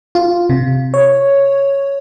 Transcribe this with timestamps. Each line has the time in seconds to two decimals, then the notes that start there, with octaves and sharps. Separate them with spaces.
0.15 F4
0.50 C3
0.94 C#5